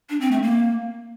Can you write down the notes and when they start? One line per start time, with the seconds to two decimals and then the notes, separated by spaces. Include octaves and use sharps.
0.10 D4
0.21 C4
0.32 A3
0.43 A#3